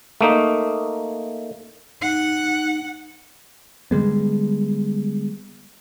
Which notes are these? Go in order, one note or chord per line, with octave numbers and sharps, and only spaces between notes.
A3 A#3 D#4
D#4 F#5
D3 G3 G#3 B3